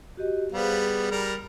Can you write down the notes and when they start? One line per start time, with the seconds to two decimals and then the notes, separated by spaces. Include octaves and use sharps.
0.17 F#4 G4 D#5
0.52 G3 B3 G#4 C5 F5
0.76 G#4
1.11 G3 A#4 B5